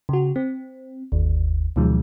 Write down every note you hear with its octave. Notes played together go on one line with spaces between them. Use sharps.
C#3 F#4
C4
G1 D#2
D2 B2 D#3 F3 F#3 G#3